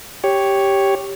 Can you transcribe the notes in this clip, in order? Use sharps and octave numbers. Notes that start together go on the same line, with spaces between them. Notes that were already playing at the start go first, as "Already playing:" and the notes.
G4 C#5